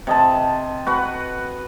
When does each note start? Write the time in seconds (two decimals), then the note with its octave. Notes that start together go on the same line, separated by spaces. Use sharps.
0.07 C3 D#5 A5
0.87 F#4 B4 F#5